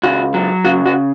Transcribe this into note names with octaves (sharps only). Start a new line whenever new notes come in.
C#2 F#4
F#3
C#3 F#4
F#4